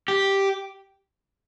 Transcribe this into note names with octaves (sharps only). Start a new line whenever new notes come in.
G4